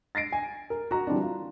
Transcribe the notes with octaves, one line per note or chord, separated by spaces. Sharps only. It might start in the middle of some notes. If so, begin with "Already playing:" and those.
A6 A#6 C7 D7
G#5
A#4
F#4 A#5
E3 G3 C4 D4
F4